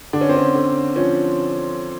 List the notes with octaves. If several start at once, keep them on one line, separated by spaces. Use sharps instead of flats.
D3 D4
C#4
C4
C#4
D3
F3 C#4